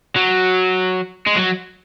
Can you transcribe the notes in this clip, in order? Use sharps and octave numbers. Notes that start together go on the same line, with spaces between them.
F#3
G#3
F#3